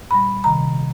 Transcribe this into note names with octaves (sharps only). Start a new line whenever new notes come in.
A#2 G3 B5
C3 D#3 A#5